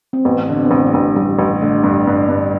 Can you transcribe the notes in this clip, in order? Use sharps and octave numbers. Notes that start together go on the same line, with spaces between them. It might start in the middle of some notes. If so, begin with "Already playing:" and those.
C4
A1 B3
D3
C4
B3
A1 C4
D4
A1
A1 G3
A1
D3 A3
G2
G2
G2